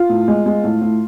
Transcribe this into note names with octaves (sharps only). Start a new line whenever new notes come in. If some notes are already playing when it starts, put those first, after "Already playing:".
Already playing: F4
A2
G#3
G#3
A2
A2